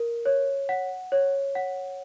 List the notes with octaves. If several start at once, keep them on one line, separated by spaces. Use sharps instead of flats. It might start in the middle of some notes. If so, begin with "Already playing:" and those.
Already playing: A#4
C#5
F#5
C#5
F#5